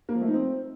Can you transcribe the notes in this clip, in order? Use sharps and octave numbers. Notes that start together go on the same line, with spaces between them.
A#3
F3
A3
D#4
C4